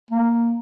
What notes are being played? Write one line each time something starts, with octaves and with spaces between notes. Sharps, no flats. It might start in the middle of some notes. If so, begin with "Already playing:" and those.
A#3